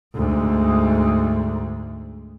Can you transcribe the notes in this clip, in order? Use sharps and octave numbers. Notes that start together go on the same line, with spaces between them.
D2 G#2